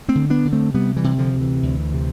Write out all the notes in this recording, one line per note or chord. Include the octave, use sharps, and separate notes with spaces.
A3 C4
D3
B3 D4
D3
A3 C4
C3 G3 B3
E3 G3
C3
D3 F3
D2
E3
D2
C3